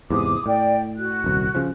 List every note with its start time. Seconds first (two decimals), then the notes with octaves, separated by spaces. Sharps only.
0.11 E2 G#2 C3 D6 D#6
0.46 A2 D5 G5
0.97 F#4 F#6
1.24 D#1 C2
1.55 C#3 F3